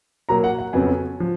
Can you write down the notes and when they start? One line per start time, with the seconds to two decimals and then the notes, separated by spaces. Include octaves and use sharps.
0.29 A#2 F#3 A#3 A#5
0.44 F#5
0.59 F#5
0.73 F2 C#3 F#3 B3 G#5
1.20 F3